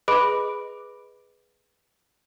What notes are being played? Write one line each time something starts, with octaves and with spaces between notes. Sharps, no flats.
G#4 B4 D#5 B5 D6 D7